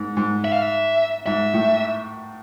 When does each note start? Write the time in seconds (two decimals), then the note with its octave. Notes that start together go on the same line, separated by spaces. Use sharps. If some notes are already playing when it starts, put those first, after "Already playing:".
Already playing: G#2
0.17 G#2
0.45 E5
0.53 F5
0.62 E5
1.26 G#2 E5
1.54 A2